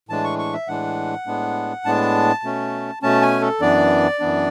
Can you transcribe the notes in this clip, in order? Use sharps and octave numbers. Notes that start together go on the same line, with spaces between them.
A2 E3 G#3 D4 A5
C#6
C#6
E5
A2 E3 G#3 D4 F#5
A2 G#3 B3 D4
A2 G#3 B3 D4 A5
B2 A3 C#4
B2 A3 C#4 A5
G#5
A4
F#2 E3 B3 D4 D5
F#2 E3 B3 D4